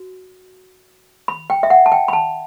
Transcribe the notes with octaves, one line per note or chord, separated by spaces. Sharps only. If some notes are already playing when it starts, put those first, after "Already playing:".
Already playing: F#4
B5
G5
E5
F#5
A5
G5
B5
A5